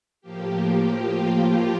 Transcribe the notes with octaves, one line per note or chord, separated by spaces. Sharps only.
A2 F3 A#3 G4
F4